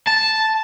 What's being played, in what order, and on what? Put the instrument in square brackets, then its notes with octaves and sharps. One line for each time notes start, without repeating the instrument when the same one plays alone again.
[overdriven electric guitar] A5